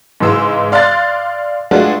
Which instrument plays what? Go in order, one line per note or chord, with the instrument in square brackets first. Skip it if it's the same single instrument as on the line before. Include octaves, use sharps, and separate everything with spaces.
[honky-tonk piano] G#2 C#3 E3 G#3 E6
D5 F5 C6 F#6 A6
G#3 A3 B3 D4 F4 F#4